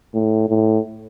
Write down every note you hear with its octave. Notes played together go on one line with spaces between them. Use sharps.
A2
A2